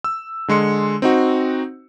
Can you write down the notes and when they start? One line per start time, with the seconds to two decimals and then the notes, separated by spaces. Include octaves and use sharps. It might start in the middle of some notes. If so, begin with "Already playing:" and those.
0.04 E6
0.48 D3 G#3 C6 C#7
1.02 C4 D#4 F#4